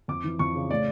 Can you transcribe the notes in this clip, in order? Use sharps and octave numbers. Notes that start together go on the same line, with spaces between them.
F2 D6
E3
F2 C#6
C#3
A2 D5